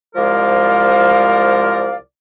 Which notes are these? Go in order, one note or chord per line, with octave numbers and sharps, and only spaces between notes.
C2 F3 G#3 A#4 D5 F5